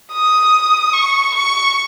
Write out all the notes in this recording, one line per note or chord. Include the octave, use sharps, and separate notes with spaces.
D#6
C#6
C#6